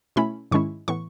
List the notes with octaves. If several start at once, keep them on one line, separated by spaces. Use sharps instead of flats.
B2 A3 C#4 E4 B5
G#2 D#3 G#3 C#4 E4 C#6
A2 E3 B3 C#6